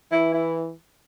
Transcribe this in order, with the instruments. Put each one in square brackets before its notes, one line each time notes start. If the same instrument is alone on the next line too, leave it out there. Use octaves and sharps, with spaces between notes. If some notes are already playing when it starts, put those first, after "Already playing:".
[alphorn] E3 [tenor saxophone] E4
[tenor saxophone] E4